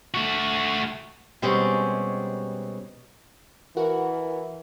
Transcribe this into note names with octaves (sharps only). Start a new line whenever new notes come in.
A3 F#4
B2 G3 G#3 C4 C#4 G4
E3 F#4 A#4 F#5